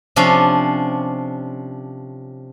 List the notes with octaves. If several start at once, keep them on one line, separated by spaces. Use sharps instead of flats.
C3 F3 C#4 D4